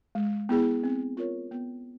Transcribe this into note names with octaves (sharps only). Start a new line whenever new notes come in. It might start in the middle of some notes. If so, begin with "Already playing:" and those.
G#3
B3 E4 G#4
C4
F4 A#4 C#5
B3